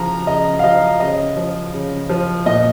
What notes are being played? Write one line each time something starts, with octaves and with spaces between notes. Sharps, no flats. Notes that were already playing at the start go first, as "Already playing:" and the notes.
Already playing: C#3 F3 A#5
C#3 D#5
F5
F3 D#5
C#3 D#5
F3
C#3
F3
A#2 D#5